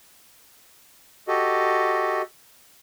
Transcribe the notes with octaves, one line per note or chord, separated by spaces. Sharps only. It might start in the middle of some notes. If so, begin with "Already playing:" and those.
F#4 G4 A4 D#5